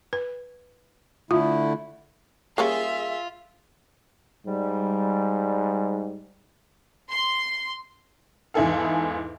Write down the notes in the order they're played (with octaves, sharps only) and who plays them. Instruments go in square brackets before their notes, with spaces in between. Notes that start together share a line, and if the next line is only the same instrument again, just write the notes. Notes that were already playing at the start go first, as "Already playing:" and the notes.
[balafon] B4
[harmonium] D3 A3 E4 [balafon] F4
[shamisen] G3 A#3 C#4 [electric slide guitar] F4 F5 [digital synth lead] G#4 [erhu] E5
[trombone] G#2 [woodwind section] G3
[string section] C6
[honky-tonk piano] E2 G#2 E4 G#4 A4 F5